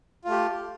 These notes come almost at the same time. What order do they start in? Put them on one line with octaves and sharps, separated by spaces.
F4 A3 G4